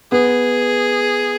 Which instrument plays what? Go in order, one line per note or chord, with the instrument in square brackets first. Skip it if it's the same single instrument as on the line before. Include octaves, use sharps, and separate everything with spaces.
[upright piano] B3 [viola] G#4